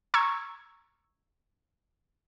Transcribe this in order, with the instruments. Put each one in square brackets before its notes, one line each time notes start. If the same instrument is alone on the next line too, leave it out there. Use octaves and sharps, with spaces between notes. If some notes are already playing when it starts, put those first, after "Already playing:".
[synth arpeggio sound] A#5 C#6 E6 G#6